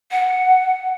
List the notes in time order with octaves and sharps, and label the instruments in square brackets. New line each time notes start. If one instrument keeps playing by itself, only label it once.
[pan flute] F#5